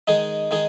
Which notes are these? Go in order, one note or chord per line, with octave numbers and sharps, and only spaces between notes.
D#3 G#3 D#4 G#4
D#3 G#3 D#4 G#4